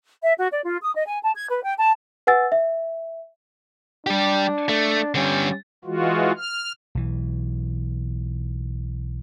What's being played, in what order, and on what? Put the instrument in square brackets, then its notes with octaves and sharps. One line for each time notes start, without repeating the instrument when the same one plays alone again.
[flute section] E5
F#4
D5
F4
D#6
D#5
G#5
A5
G#6
B4
G5
A5
[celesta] B4 F#5 G#5 E6 A6
E5
[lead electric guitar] G3 G4 [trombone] D4
[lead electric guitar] A3
[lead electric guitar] D3 G3 [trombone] C#4
[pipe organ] E3 G#3 F4 F#4
F6
[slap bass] B1 E3